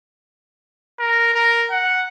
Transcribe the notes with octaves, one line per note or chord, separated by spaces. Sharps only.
A#4
A#4
F#5